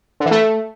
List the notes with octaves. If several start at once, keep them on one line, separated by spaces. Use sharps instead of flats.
D3
E3
A3